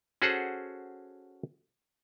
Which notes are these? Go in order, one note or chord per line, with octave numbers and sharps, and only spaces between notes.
C#4 F#4 G#4 A4 C5 F#5